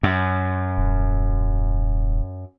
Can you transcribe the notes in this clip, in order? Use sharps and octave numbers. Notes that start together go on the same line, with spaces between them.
F#2
D#1